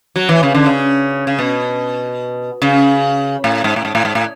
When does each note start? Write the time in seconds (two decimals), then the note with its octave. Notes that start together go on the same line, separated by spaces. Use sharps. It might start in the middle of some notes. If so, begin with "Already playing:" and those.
0.16 F#3
0.29 E3
0.43 C#3
0.54 D3
0.66 C#3
1.27 C#3
1.39 B2
2.62 C#3
3.44 A2
3.64 G#2
3.76 A2
3.85 G#2
3.95 A2
4.05 G#2
4.15 A2